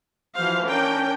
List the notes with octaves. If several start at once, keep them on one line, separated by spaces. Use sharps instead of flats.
E3 F3 F#4 C5 F5
C#4 D4 A#4 G5